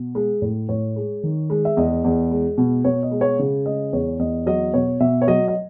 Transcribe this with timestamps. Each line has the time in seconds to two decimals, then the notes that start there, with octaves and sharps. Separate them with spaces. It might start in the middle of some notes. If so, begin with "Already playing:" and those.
Already playing: B2
0.15 G#3
0.42 A2
0.69 A2 C#5
0.96 G#3
1.23 D#3
1.50 G#3
1.65 E5
1.77 E2 D#5
2.04 E2
2.31 G#3
2.58 B2
2.84 B2 C#5
3.03 D#5
3.11 G#3
3.21 C#5
3.39 C#3
3.66 G#3 D#5
3.93 E2 C#5
4.19 E2 D#5
4.46 F#3 D#5
4.74 B2 C#5
5.00 B2 E5
5.22 C#5
5.27 F#3 D#5
5.48 D#5